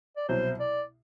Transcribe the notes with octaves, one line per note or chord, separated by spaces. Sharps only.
D5
C2 B2 F#3 C5
D5